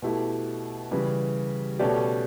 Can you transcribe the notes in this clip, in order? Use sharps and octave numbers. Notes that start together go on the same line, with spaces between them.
B2 A3 E4 G4
C#3 E3 G3
B2 A3 C#4 G4 D5